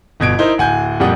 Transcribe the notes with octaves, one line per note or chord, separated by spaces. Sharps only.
G1 B2 G#6 D7
D#4 E4 A#4 C5 D#5
D1 F#5 G#5 G6
F2 A#2 G3 F#5 D#6